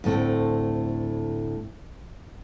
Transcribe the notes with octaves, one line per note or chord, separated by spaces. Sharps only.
D2 A2 A3 C4 G5